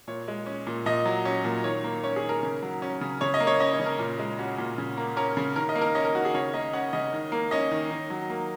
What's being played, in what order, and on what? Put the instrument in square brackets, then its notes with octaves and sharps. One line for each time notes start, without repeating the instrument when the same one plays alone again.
[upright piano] A#2 C#5
G#3
C#4
A#2
A#2 D#5
F#3
C#4
A#2
D#3 C#5
A#3
C#4 C#5
G#4
D#3
A#4
C#3
F#3
C#4
C#3
C#3 C#5
D#5
A#3
C#5
C#4 D#5
C#5
C#3
A#4
A#2
G#3
C#4 F#4
A#2
C#3
A#3
C#4 A#4
C#3
D#3 A#4
D#5
A#3
A#4
C#4 D#5
A#4
D#3 F#4
G#4
C#3 C#5
A#3 D#5
C#4 F#5
C#3 D#5
D#3
A#3
C#4 D#5
D#3
D#3
F#3
A#3